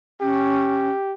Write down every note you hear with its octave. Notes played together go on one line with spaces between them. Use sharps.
C#4 G4